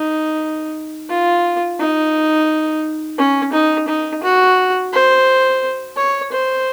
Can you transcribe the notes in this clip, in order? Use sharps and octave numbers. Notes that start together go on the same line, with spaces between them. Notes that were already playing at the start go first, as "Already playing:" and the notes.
Already playing: D#4
F4
D#4
C#4
D#4
D#4
F#4
C5
C#5
C5